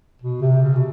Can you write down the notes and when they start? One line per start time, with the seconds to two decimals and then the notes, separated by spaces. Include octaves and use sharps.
0.22 B2
0.42 C3
0.62 C#3
0.75 B2